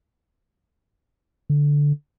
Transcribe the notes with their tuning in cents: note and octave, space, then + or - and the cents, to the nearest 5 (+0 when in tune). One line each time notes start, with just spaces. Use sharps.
D3 -10